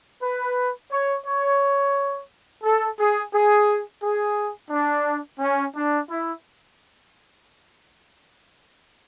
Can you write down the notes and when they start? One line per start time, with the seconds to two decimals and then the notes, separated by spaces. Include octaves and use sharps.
0.22 B4
0.91 C#5
1.25 C#5
2.63 A4
2.97 G#4
3.32 G#4
4.00 G#4
4.69 D4
5.39 C#4
5.74 D4
6.08 E4